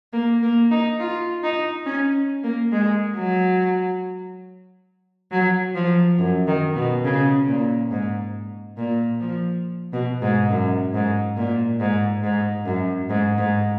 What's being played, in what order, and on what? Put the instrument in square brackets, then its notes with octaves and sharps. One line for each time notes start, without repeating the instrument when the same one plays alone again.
[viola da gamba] A#3
A#3
D#4
F4
D#4
C#4
A#3
G#3
F#3
F#3
F3
F#2
D#3
B2
C#3
A#2
G#2
A#2
F3
B2
G#2
F#2
G#2
A#2
G#2
G#2
F#2
G#2
G#2